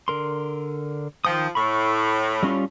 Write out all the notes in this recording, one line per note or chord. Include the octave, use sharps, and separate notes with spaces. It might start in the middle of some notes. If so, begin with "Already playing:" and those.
D3 A#4 C6
D#3 F3 G5 D#6
A2 B5 C#6
G3 C#4 F4